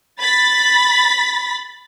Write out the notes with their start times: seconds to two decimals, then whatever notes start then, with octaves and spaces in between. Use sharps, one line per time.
0.20 B5 A6 B6